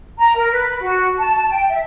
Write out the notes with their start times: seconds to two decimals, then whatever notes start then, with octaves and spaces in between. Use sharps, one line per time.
0.18 A#5
0.36 A#4
0.52 B4
0.80 F#4
1.19 A5
1.49 G5
1.69 E5